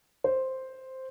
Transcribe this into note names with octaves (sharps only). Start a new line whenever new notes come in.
C5